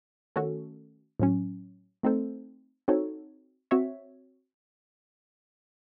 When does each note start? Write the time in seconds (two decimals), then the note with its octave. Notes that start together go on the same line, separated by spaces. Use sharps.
0.36 D#3 A3 C#4 F#4 A4
1.20 A2 F#3 C#4
2.03 A3 C4 D#4 A4 C5
2.88 C4 D#4 F#4 A4 C#5
3.71 C4 F#4 C#5 E5